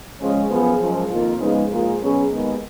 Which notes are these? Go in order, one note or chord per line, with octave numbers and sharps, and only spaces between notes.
C#3 F3 G#3 C#4
F#2 F3 B3 F4 G#4
F#2 F3 G#3
F2 D#3 A#3 F4
C#3 F3 G#3 B3 D#4
G#2 F3 A#3 F4 G#4
B2 F#3 C#4 G#4
D#2 D#3 G#3 B3